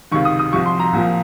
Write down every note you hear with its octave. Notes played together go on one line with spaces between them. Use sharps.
C#2 C3 D#3 C#6
D#6
D#6
C2 C3 F3 C#6
C6
A#5
C2 A#2 F3